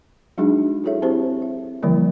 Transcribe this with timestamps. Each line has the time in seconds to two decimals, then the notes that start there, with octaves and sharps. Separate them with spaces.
0.38 F#3 G#3 D4 D#4 F#4 G#4
0.84 E4 F#4 G#4 A4 C#5 E5
1.02 C4 E4 G4 G#4 C5
1.42 E5
1.82 D3 E3 F3 G3 A#3 E4